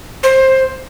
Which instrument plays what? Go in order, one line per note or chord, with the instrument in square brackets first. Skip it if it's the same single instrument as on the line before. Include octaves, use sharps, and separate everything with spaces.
[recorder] C5